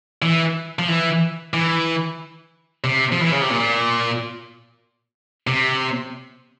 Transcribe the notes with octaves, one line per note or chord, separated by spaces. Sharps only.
E3
F3
E3
E3
C3
F3
E3
C#3
C3
A#2
C3